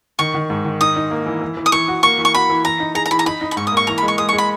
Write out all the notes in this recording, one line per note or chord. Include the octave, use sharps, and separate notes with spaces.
D#3 C#6
D#3
G#2
D#3
D#4 D#6
D#4
A#3
E3
E3
E3
D#6
E3 C#6
F#4
A#3 C#6
E3
C#6
F#4 B5
E3
E3 A#5
D#4
G#4 A#5
A#5
E3 B5
A#5
D#4 B5
D#4
B5
G#2 C#6
D#6
A#3 C#6
E3 A#5
G#3 B5
C#6
G#3 D#6
G#3 C#6
B5